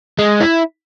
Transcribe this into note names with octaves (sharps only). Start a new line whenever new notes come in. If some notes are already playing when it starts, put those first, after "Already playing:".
G#3
E4